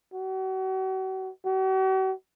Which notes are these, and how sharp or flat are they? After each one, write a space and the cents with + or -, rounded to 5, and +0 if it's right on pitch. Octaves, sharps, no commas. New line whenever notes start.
F#4 +40
F#4 +45